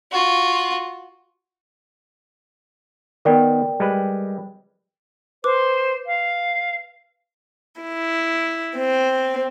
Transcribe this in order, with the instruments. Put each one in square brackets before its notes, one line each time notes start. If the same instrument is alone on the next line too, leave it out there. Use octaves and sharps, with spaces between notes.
[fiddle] F4 F#4
[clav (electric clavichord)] D#3 B3 [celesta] A#4 D5 G5
[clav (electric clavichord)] G3 G#3 B4
[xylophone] B4 D6 [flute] C5
[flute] F5
[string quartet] E4
C4